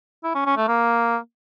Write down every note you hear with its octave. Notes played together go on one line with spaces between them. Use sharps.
E4
C#4
C#4
A3
A#3